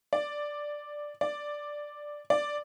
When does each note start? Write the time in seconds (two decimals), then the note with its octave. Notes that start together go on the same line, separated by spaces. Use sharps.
0.13 D5
1.21 D5
2.30 D5